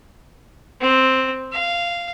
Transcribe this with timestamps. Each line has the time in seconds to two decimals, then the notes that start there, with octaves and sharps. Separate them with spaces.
0.81 C4
1.52 F5